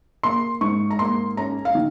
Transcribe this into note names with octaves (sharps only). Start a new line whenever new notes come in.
A#3 C6
G#2 C#6
A#5
A#3 C6
C#4 A#5
F5
D#3